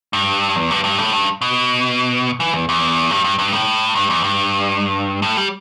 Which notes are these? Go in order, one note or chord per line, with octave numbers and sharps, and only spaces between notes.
G2
E2
G2
G2
A2
G2
B2
E3
E2
E2
G2
G2
G2
A2
G2
E2
G2
A2
G3